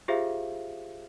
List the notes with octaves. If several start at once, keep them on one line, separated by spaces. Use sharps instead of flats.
F4 G4 G#4 C5 E5 F5